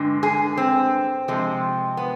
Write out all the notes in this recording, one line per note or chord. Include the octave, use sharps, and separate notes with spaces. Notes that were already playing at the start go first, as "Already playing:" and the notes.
Already playing: G2 D3 G#3
G#4
C4
C3 F3 G#3
B3